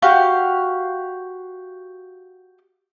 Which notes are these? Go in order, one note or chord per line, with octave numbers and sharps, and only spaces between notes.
F#4 G4 F5